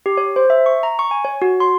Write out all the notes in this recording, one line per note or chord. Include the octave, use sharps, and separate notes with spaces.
G4
C#5
C5
E5
C#6
A#5
C#6
G#5
C#5
F#4
C6